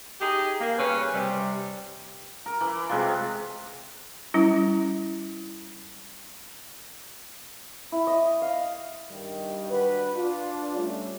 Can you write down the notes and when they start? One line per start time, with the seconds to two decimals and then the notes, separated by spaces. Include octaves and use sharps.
0.21 D#4 G4 G#4
0.61 A#3
0.78 C#3 G3 C#4 B4
1.14 C3 G3
2.46 A#4
2.61 E3
2.89 C3 G#3 F4
4.34 G3 C#4 E4
7.92 E4
8.07 D#5
8.42 F5
9.10 G2 D#3 G3
9.70 G3 D4 F#4 B4
10.13 D4 F4
10.75 G3 A3 C#4